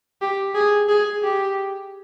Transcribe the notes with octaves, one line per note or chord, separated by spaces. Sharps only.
G4
G#4
G#4
G4